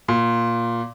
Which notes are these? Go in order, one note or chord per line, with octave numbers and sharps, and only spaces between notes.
A#2